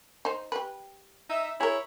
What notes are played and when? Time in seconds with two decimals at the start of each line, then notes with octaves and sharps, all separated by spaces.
0.25 D#4 C5
0.52 G4 B4
1.30 D#4 E5
1.61 E4 G#4 A#4 C#5